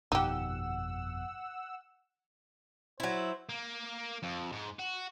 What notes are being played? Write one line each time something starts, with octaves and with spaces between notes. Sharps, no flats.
G1 F2 B2 D#4 G4 F#5 E6
F#3 E4 C5
A#3
F2
G#2
F#4